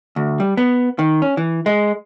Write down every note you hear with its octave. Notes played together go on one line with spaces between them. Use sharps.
D2
G3
B3
D#3
C#4
E3
G#3